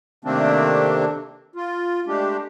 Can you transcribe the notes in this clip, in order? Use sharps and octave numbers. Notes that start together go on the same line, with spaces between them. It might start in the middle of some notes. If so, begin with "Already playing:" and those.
C3 D#3 A3 A#3 C4 D4
F4
G#3 A3 D4 G4